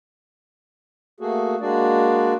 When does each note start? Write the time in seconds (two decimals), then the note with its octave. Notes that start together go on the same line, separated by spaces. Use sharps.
1.20 A3 A#3 F#4 G#4 A4
1.61 G#3 A#3 D4 F#4 D5